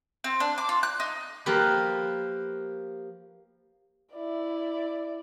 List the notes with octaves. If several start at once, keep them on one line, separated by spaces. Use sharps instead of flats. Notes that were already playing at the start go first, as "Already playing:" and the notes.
C4
D4
D6
F4
F#6
D#4
F3 A#3 G4 B4
E4 D5